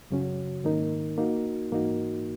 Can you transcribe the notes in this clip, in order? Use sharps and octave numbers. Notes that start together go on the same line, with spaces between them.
F#2 C#3 F#3 C#4 F#4
G#2 D#3 A#3 D#4 A#4
A#3 D#4 F#4
G#2 E3 A#3 D#4 F#4